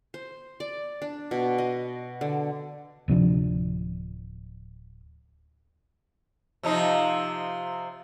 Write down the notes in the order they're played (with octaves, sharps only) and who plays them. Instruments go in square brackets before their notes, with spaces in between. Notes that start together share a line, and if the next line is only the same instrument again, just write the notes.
[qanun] C5
D5
D4
B2
D#5
D3
[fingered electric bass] D1 C3 F3 D4
[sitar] C3 F3 D#4